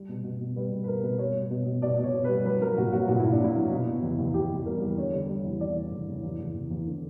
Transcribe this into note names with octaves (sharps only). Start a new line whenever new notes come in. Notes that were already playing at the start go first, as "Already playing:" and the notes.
Already playing: G3
B2
B2
B2
G3 B4
B2
B4
G3 A#4
B2 B4
G3 C#5
B2
B2
B2
B2 D5
B2
C#5
B2
G3 B4
F#3 B4
F#3 A#4
A#2 F#4
F#3 F#4
A#2 F#4
A#2 E4
D4
F#3 E4
F#3
B2
B2
E2
E2
E2 G4
E2
G3 A#4
E2
D3 C#5
G3
G3
E2
E2 D5
E2
E2
E2
E2
E2
E2
E2
D3